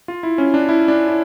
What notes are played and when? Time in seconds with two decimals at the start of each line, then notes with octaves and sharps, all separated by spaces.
0.08 F4
0.23 E4
0.38 C#4
0.54 D4
0.69 E4
0.88 D4
1.08 E4